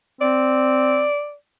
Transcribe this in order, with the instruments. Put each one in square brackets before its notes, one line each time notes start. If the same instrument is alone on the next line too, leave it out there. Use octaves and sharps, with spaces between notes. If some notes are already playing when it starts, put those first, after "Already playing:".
[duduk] C4 [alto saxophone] D5